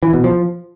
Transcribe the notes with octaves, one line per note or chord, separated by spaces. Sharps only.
E3
B2
F3